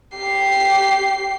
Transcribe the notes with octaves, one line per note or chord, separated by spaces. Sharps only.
G4 C7